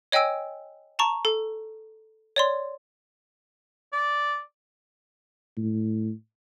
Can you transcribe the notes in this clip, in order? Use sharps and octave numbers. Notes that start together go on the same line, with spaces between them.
C#5 D#5 G5 G#5 E6 D7
A5 A#5 C#6
A4
C#5 D5 C6
D5
A2